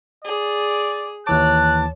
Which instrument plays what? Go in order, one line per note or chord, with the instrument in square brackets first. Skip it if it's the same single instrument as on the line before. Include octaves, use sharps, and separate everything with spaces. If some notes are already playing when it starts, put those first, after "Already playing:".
[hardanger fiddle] G#4 [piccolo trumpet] D5
[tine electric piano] D#2 E3 D6 [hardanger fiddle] C#5 [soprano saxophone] A5 [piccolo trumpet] F#6